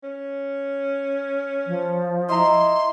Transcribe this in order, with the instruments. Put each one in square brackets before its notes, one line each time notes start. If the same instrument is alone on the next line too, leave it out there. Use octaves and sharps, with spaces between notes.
[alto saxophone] C#4
[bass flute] F3
[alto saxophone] E4 [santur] D#5 E5 A#5 [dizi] C6